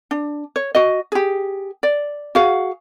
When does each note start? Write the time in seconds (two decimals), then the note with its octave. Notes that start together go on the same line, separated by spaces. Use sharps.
0.11 D4
0.56 C#5
0.75 F#4 D#5
1.12 G4 G#4
1.83 D5
2.35 F#4 G#4 F5 F#5